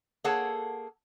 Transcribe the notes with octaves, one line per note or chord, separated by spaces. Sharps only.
A#3 G#4 A4 C#5 F#5 A5